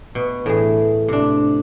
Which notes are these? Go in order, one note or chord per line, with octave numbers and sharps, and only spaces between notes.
B2
A2 E3 G#4
C3 D4